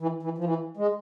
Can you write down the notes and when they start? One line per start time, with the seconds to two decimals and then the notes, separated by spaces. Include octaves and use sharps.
0.01 E3
0.23 E3
0.38 F3
0.44 E3
0.77 G#3